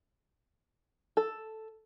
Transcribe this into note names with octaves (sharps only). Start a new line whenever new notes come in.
A4